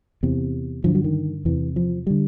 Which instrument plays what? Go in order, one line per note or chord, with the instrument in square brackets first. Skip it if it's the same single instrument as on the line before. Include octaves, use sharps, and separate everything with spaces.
[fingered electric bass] E2 C3
G2 D3 F3
F#3
D#3
E2 C3 E3
F3
D3 G3